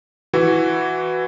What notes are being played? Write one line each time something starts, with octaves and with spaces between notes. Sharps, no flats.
E3 E4 F#4